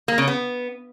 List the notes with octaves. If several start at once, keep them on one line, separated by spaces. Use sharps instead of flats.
A#3
C#3
B3